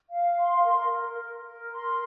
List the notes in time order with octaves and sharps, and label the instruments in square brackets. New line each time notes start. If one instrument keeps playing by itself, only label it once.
[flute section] F5
C6
A#4
A#4
A#4
A#4
C6